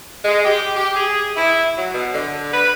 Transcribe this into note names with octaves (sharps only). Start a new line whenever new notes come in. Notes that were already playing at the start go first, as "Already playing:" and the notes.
G#3
G4
G4
G#4
E4
F#3
B2
D3
B4